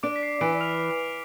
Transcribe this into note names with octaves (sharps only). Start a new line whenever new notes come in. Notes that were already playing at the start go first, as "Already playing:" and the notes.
D4 D6 D7
B6
C7
E3 D6 D7
F6 F7